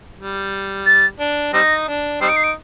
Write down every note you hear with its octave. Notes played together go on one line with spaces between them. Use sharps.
G3
A6
D4
G3 C4 D#4 A#6
D4
G3 C4 D#4 C7
D7
C7
D7